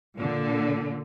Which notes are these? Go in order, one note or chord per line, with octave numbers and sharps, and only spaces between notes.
A#2 D3